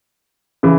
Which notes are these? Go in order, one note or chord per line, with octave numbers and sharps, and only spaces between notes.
C#3 E3